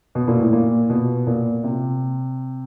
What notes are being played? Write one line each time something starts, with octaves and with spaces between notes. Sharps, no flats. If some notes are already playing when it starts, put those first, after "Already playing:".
B2
A#2
A2
A#2
B2
A#2
C3